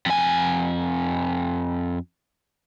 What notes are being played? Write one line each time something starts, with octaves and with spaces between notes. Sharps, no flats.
F2 G#5